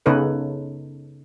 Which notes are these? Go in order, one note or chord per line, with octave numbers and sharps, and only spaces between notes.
C#3 B3 D#4 A4 B4 C#5